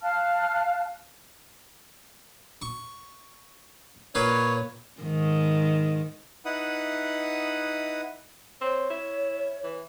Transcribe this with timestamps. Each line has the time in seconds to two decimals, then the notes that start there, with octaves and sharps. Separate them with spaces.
0.03 F5 A5 F6 F#6
2.62 C#6
4.15 A#2 B4 C#5 F5
5.01 G#2 D#3
6.45 D#4 E4 B4 F#5 D#6
8.61 C4 C#5
8.90 E4
9.64 E3